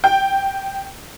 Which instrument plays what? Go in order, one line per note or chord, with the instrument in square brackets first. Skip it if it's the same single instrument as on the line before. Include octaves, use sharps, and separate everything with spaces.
[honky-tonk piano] G5